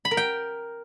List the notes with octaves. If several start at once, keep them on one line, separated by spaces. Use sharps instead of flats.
B5
A#4
G5